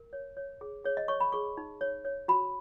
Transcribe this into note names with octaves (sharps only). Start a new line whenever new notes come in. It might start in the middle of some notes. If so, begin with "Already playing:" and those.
Already playing: A#4
C#5
C#5
G#4
G#4 C#5
D#5
C#5 C#6
B5
G#4 C#6
D#4
C#5
C#5
F#4 B5